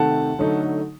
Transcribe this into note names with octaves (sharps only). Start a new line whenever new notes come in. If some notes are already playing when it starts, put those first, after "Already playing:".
Already playing: C3 D#3 A3 F#5 A5
D3 F#3 A3 D#4